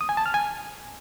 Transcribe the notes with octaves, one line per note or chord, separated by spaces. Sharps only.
D#6
G#5
A5
F6
G#5